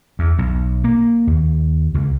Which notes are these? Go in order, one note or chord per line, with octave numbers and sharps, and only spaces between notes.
E2
B1
A#3
D#2
C#2